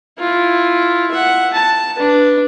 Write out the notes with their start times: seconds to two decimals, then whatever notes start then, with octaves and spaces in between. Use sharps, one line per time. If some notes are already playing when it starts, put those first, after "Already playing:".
0.19 E4 F4
1.12 E5 F#5
1.53 A5
1.95 D4 B4